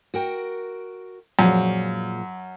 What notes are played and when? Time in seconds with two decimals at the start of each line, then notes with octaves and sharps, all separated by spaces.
0.14 F#4 A#4 G5
1.39 F#2 A#2 F3 G#3